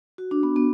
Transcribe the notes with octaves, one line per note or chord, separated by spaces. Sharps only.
F#4
D4
B3
B3